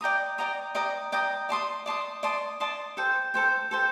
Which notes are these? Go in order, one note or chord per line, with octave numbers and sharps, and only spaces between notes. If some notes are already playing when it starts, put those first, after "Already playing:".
D5 G5 A#5 D#6
D5 G5 A#5 D#6
D5 G5 A#5 D#6
D5 G5 A#5 D#6
D5 A5 C6 D#6
D5 A5 C6 D#6
D5 A5 C6 D#6
D5 A5 C6 D#6
A4 C5 G5
A4 C5 G5
A4 C5 G5